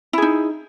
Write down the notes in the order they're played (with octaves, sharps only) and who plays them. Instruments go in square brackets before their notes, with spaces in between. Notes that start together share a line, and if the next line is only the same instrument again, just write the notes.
[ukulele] E4
G#4
D#4